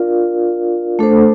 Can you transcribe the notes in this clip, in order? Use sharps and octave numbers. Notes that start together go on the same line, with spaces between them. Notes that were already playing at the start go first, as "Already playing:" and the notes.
Already playing: D4 F4 A#4 D5 F5
A3 D4 A4 C5